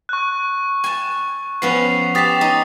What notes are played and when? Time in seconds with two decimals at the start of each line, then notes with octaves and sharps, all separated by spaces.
0.09 C#6 F#6
0.84 G#5 A5
1.62 F3 B3 C#4 C7 F7
2.15 G4 A5 D#6 A6 B6
2.41 D#4